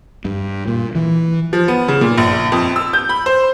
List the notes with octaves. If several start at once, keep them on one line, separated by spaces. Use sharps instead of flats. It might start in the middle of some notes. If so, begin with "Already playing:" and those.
G2
A#2
E3
F3
B3
C#3
A#2
A#1
F2
E6
G6
B5
C5